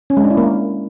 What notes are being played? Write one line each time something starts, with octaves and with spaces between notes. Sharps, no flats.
C#4
G#3
D4
E4
A#3